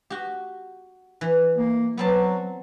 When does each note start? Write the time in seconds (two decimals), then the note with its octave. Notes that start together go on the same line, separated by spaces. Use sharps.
0.10 F#4 G4
1.21 E3
1.57 A#3
1.97 F#3 B3 C4 A5